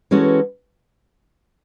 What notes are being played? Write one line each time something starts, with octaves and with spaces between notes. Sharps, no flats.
E3 G#3 C#4 F#4 A4